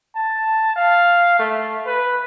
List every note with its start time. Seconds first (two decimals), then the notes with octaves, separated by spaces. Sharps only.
0.15 A5
0.76 F5
1.39 A3
1.86 B4